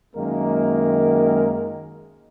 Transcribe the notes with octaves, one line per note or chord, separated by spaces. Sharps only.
F#2 D#3 G#3 A#3 A#4